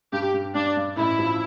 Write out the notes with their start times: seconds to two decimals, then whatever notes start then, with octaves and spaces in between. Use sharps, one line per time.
0.12 G2 G4
0.34 G2
0.55 G2 D4
0.77 G2
0.97 A1 E4
1.19 F3